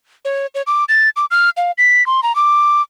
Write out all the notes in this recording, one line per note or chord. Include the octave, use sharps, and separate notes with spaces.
C#5
C#5
D6
A6
D6
F6
F5
B6
C6
A#5
D6